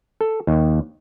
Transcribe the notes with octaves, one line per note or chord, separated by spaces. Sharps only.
A4
D#2